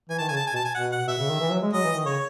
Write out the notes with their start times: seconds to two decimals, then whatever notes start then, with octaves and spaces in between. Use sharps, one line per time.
0.09 E3 G#5
0.18 D#3 A5
0.29 C#3 G#5
0.37 A5
0.47 G#5
0.54 B2 A5
0.65 G#5
0.74 B2 F#5
0.92 F#5
1.07 B2 E5
1.18 C#3
1.29 D#3
1.41 E3
1.51 F#3
1.62 G#3
1.73 F#3 D#5
1.84 E3
1.95 D#3
2.06 C#3 C#5